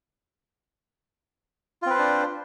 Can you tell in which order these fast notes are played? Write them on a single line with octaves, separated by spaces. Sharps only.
F4 C4 B4 C5 D4